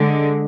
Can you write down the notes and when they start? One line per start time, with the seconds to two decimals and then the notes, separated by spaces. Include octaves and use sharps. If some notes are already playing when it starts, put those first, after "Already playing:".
Already playing: D3 G#3